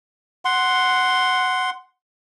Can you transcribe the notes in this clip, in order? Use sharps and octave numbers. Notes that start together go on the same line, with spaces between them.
F#5 C6